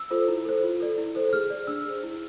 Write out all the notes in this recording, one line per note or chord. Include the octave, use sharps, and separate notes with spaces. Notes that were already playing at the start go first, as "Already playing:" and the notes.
Already playing: E6
F4 A4 C5
E4
A4 C5
F4
A4 D5
E4
A4 C5
G#4 F6
D5
D4 E6
G#4 C5
E4